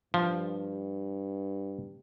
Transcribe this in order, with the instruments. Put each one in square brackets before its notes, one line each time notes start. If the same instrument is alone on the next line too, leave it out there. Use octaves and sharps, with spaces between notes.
[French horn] G2 [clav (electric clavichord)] F3